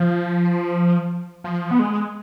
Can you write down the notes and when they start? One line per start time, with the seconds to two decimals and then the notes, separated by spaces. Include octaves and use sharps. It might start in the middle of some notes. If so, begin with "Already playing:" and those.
Already playing: F3
1.44 F3
1.71 B3
1.79 G#3